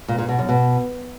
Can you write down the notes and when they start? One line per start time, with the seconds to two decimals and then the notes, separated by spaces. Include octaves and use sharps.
0.08 A#2
0.18 A#2
0.29 B2
0.39 F#2
0.49 B2